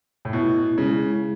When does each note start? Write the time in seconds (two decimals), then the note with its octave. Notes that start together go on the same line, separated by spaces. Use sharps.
0.25 A2
0.33 B2 E4
0.78 C#3 G#3